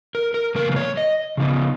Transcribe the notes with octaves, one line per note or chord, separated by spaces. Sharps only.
A#4
A#4
C#3 F3 A#3 A#4
B4
C#5
D#5
C#3 F3 B3 D#4